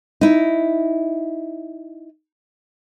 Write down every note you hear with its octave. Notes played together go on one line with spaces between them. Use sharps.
D#4 E4